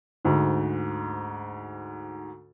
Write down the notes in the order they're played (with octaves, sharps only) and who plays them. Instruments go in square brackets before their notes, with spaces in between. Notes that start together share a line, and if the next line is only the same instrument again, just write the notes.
[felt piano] D2 G#2